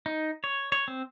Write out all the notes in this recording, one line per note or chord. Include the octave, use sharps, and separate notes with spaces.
D#4
C#5
C#5
C4